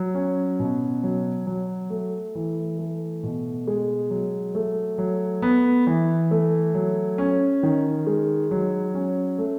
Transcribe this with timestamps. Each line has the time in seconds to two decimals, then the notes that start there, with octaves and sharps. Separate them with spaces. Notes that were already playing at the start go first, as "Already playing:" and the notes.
Already playing: F#3
0.14 C#4
0.60 B2
1.03 F#3
1.46 F#3
1.90 A3
2.35 E3
2.78 A3
3.23 B2
3.67 G#3
4.10 F#3
4.55 A3
4.98 F#3
5.42 B3
5.87 E3
6.31 A3
6.74 F#3
7.18 C#4
7.63 D#3
8.07 G#3
8.51 F#3
8.94 C#4
9.39 A3